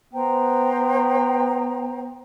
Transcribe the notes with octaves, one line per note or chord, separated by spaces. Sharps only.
B3 C5 G5 A#5